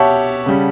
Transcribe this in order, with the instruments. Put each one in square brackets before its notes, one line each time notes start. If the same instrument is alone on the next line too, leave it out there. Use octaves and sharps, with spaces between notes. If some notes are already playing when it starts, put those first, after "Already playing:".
Already playing: [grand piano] B2 G4 C#5 E5 F#5 A5
C#3 G3 C#4